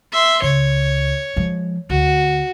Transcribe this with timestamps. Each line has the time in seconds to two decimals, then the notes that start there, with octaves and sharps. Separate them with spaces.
0.12 E5 C6
0.42 C#2 C#5
1.36 F3 G#3
1.90 D2 F#4